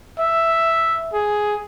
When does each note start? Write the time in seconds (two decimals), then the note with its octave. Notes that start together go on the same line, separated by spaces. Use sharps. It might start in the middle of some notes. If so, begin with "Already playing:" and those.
0.19 E5
1.13 G#4